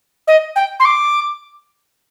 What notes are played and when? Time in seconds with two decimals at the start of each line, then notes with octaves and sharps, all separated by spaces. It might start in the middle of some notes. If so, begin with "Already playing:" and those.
0.27 D#5
0.56 G5
0.80 C6
0.85 D6